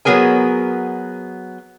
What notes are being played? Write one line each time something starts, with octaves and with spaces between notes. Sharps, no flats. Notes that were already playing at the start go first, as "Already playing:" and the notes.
F#3 B3 G#4 A#4 G#5